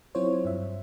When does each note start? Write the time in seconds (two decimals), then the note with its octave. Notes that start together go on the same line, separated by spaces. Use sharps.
0.15 F#3 C4 E4 F4 C5 C#5
0.45 G2 E5